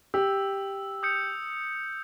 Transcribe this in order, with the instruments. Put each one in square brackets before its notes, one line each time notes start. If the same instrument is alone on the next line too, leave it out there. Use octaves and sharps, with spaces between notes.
[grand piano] G4 [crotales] E6
[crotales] D#6 G6 C#7